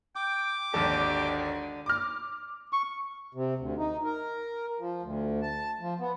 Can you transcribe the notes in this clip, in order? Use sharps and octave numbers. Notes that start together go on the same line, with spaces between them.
G5 D6
G#1 D#2 D3 G4 A4
D6 F6
C#6
C3
D2
D#4
A#4
F3
D2
A5
F3
B3